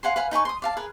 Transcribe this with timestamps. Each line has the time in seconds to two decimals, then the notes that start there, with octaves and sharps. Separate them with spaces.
0.03 F5 F#5 G#5 C6
0.16 B4 F5 F#5 G#5
0.31 D#4 B4 G#5 C#6
0.45 C6 D#6
0.62 D5 F5 A5
0.77 G#4 A#4 B4